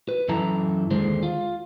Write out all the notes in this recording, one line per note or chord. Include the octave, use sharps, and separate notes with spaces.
B4
F#2 E3 E4 A4 A#5
D#2 D3 G#3 C5
F4